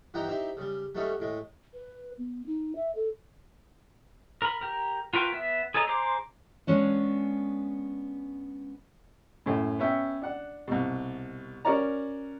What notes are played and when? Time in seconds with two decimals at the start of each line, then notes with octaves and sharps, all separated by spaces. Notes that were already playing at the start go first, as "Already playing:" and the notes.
0.14 G2 E3 D#4 F#5 G5 A#5
0.28 C4 D#4 E4 G4
0.57 C#3 G3
0.95 G3 A3 C#4 D#4 F#4 A4
1.20 A2 G#3
1.74 B4
2.18 B3
2.46 D#4
2.76 E5
2.95 A4
4.42 A#4 B5
4.61 G4 A#4
5.13 F4 F#4 A#4 B4 G5
5.33 B3 E5
5.74 G#4 A4 C#5 D#5 A#5
5.87 G#4 C5 A#5 C6 D6
6.67 G#3 B3 C#4 D4
9.46 F#2 A2
9.79 B3 C#4 E5 G5
10.22 D4 F#5
10.68 C2 B2
11.65 C#4 F#4 A#4 C#5 D5 A#5